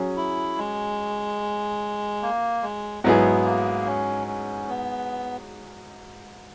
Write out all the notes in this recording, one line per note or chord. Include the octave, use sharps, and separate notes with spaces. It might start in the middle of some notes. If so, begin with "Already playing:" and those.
Already playing: F#3 C#4 G#4
E4
G#3
A#3
G#3
G#2 F#3 G#3 B3 E4 G#4
A#3
C#4
C#4
B3